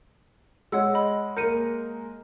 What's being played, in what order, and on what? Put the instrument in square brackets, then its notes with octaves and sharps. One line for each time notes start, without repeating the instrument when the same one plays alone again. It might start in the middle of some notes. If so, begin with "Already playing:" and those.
[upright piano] G#3 [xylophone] C#5 F#5 E6
[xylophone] D#5 B5
[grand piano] A#3 A#4 [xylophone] G6 C#7 D#7